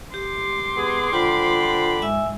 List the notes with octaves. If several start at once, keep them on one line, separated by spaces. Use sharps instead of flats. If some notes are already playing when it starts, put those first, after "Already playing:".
G4 C6 D6
B3 G#4
D3 F4 C5 G5 B5
G#2 E5 G#5 E6